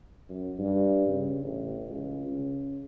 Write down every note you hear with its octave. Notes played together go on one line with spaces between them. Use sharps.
F#2
G2
C#3
A1
C#2
C#3